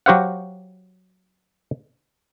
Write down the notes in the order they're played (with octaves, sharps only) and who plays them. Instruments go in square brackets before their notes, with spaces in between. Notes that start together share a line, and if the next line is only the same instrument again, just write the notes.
[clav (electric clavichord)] F#3 F#4 G4 C5 F5 F#5